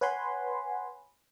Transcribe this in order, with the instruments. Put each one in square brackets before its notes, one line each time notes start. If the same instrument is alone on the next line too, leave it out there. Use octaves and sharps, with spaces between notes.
[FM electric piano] B4 C#5 F#5 G#5 B5 C6